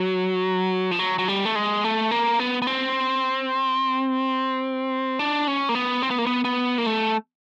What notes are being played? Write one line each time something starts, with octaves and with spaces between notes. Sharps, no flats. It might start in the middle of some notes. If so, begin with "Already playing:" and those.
Already playing: F#3
F3
F#3
F#3
G3
A3
G#3
A3
A#3
B3
B3
C4
D4
C#4
A#3
B3
C4
B3
A#3
B3
B3
A#3
A3